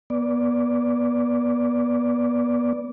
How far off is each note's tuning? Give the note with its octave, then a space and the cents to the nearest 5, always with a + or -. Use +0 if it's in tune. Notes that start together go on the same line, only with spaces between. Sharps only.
B3 -25 D5 -10